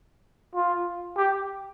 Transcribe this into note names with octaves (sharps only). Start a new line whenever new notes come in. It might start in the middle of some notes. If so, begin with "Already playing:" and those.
F4
G4